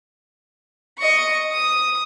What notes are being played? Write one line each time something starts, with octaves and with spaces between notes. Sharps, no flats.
D#5 C#6
D#6